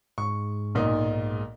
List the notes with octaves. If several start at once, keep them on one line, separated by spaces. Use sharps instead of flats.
G#2 C#6
B1 A#2 D#4